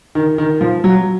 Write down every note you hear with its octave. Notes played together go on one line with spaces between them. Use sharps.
D#3
D#3
F3
F#3